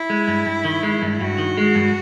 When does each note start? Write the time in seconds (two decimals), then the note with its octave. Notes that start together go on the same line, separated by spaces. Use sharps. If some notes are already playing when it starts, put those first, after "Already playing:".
Already playing: E4
0.10 G#3
0.28 G2
0.46 G2
0.65 D#3
0.83 G#3
1.02 G2
1.20 G2 F#4
1.38 D#3
1.57 G#3
1.75 G2